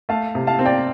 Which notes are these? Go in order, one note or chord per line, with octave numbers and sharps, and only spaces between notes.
A3 F5 A5
C3
F5 A5
C4
D5 G5